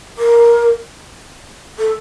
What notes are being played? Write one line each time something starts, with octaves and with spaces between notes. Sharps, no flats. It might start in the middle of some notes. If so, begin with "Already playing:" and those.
A#4
A4